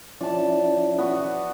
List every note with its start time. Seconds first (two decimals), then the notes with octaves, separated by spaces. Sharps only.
0.21 F3 C#4 E4 D5 A5
0.98 B3 F#4